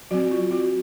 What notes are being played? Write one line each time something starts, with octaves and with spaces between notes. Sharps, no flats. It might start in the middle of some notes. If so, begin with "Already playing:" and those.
F#3 C4 F#4
F4
F#4